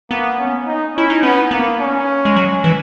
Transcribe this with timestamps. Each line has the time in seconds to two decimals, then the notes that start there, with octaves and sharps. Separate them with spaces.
0.10 A#3 B3
0.38 C#4
0.67 D#4
0.95 C#4 E4
1.10 D#4
1.23 B3 C#4
1.51 A#3 B3
1.80 C#4
2.25 G#3
2.36 F#3
2.64 E3